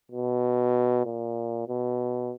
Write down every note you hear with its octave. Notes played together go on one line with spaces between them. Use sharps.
B2
A#2
B2